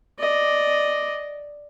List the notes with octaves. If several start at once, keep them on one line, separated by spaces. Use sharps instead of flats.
D5 D#5